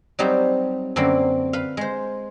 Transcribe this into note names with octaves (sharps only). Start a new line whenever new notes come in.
F#3 G3 C4 D#4 G4
F#2 D3 A#3 C4 B4 D5
B4 F5
G#3 C5